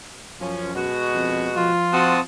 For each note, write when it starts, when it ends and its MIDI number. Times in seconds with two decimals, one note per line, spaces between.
0.40 0.88 42
0.40 0.72 53
0.40 0.72 61
0.75 1.70 47
0.75 1.70 56
0.75 1.70 66
1.14 1.48 41
1.56 2.24 53
1.56 2.19 65
1.93 2.20 60
1.93 2.19 66
1.93 2.20 81
1.93 2.20 87